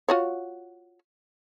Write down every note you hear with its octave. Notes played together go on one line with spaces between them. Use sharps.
F4 F#4 C#5